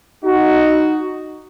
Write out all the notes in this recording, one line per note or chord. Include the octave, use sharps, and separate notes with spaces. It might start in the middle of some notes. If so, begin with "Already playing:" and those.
D#4 F#4